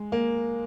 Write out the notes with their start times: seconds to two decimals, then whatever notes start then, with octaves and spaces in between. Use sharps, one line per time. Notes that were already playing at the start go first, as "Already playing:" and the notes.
Already playing: G#3
0.12 A#3